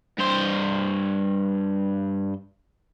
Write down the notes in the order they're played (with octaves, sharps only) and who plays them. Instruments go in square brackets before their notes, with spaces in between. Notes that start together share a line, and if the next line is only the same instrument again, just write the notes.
[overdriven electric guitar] G2 C5